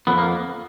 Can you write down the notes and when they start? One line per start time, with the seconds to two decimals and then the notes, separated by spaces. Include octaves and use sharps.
0.07 F2 B3
0.18 A#3